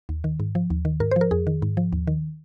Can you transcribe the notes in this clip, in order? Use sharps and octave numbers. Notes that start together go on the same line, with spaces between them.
D#2
D#3
G#2
F3
D#2
D#3
G#2 A#4
F3 C5
A#4
F2 G#4
D#3
G#2
F3
D#2
D#3